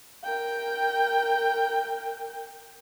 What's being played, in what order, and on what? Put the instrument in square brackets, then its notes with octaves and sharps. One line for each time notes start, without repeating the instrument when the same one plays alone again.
[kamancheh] A#4 G5